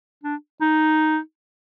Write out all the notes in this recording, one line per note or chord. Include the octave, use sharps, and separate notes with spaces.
D4
D#4